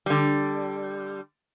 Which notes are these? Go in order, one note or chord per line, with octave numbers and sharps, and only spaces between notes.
D3 G3